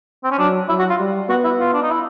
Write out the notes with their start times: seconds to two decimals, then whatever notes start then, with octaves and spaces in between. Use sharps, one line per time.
0.24 C4
0.31 C#4
0.39 F#3 D4
0.69 F#3 E4
0.79 F#4
0.90 F4
1.00 G3
1.29 B3 F#4
1.44 E4
1.60 F4
1.74 D4
1.82 D#4
1.91 E4